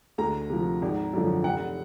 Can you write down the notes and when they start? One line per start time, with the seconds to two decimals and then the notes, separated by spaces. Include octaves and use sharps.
0.18 D2 A#5
0.50 C3 F3
0.82 G#1
1.13 F#2 D3 F3
1.44 F1 F#5